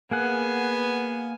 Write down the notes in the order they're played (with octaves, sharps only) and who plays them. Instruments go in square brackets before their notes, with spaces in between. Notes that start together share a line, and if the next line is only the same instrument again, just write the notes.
[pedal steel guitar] A#3 G#4 F#5 [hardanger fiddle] B3 G#5